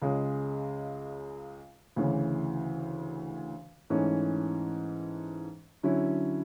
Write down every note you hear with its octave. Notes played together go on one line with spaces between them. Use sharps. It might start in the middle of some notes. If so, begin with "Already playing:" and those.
C#2 C#3 G#3
D2 C#3 E3
G#2 E3 A3 C#4
D3 F#3 C#4 E4